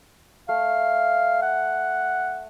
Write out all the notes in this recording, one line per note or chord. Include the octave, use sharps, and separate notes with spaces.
A3 F5
F#5